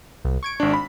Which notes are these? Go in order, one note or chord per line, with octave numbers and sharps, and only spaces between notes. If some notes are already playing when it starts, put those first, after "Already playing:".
C2
C#6 G#6 D7
G#1 D4
B5